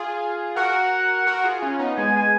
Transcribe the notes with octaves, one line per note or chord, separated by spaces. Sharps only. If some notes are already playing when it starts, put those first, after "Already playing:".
Already playing: F4 G#4
F#4 A#4 F#5
F#4 A#4
F4 G#4
C#4 F4
B3 D#4
G#3 B3 G#5
G#5